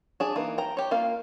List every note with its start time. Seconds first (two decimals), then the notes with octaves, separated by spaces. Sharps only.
0.20 D4 G#4 D5
0.36 E3 A#3 D#4
0.58 G5 A#5
0.77 G4 C#5
0.91 A#3 F4 F5